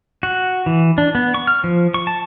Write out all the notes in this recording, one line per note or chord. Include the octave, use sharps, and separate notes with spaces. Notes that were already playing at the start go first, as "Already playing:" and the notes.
F#4
E3
D4
B3
C#6
F6
F3
C#6
A5